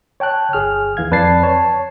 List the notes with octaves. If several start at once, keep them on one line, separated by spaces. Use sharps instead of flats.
C#5 G5 A5 F#6
G1 G#4 F6
D#2 E3 F5 G#6
F2 B4 D5 A5 A6 C7
C#5 A5